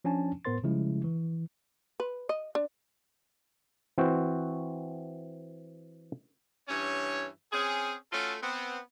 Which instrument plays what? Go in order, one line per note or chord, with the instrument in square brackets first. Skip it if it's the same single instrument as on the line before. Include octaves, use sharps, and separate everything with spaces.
[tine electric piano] F3 C#4 D4 G#5 A5
A2 B3 A#4 C5 C6 A6
C#3 F3 G3 G#3 E4
E3
[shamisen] B4
D#5
D4
[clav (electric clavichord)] E3 C4 F#4 C5
[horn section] G2 E3 C#4 C#5
C4 C#4 G#4
A3 C#4 F4 F#4 A4
B3 C4